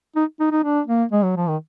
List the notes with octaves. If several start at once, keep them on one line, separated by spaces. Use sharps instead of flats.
D#4
D#4
D#4
D4
A#3
G#3
F#3
F3
D#3